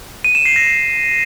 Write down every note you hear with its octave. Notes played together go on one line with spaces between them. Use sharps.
D#7
E7
C7
A#6
C7